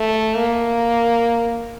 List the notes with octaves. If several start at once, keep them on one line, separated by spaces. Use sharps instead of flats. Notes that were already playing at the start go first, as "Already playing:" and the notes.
Already playing: A3
A#3